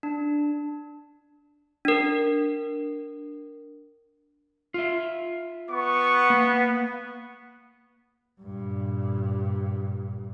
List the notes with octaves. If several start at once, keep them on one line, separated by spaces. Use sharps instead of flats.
D4
D4 A#4
F4 E5
B3 C#6
A#3
G2 A#2